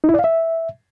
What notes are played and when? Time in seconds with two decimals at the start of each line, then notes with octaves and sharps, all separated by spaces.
0.04 D#4
0.09 E4
0.14 D5
0.19 F5
0.24 E5